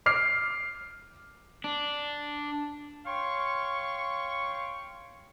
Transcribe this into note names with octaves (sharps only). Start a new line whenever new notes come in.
D6 F6 C7
D4
C#5 F5 G5 C6 C#6